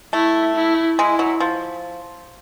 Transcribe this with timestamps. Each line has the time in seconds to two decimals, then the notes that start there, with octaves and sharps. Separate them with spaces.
0.13 A3 E4
0.55 E4
0.98 G#3 E4
1.19 F#3
1.40 F3